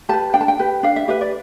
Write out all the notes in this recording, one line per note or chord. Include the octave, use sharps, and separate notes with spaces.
G4 B4 A5
D4 G5
A5
G5
G4 B4
D4 F5
E5
G4 B4 E5
D5